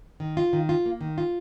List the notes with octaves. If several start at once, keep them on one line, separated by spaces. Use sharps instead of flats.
D#3
F4
D#3
F4
A#3
D#3
F4